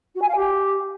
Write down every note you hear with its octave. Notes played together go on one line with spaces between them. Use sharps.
F#4
G#5
F5
G4